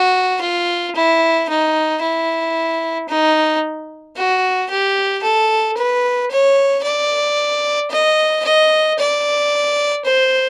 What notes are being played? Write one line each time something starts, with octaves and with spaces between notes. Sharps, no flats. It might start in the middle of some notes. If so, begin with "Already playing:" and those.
Already playing: F#4
F4
E4
D#4
E4
D#4
F#4
G4
A4
B4
C#5
D5
D#5
D#5
D5
C5